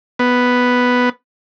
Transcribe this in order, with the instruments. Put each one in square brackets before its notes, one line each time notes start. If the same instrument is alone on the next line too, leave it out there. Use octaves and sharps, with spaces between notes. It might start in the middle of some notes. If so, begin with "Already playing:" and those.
[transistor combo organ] B3